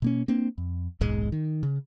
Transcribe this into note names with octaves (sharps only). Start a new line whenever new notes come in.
B2 A#3 C#4
A#3 C4 D4
F2
D#1 B1 G#2 G#3
D#3
C#3